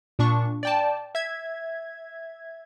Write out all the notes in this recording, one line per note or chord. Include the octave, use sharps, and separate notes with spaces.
A#2 D4 C#6
D5 G5 A5
E5 G#6